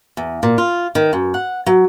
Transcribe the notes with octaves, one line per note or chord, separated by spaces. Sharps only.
E2
A#2
F4
D#3
F#2
F#5
F#3